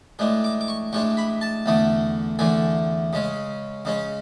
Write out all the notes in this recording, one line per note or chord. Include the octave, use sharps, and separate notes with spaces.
A2 G#3 D4
D6
D6
C#6
A2 G#3 D4 C#6
B5
A5
E2 D3 A3
E2 D3 A3 G#5
C#3 G#3 C#4
C#3 G#3 C#4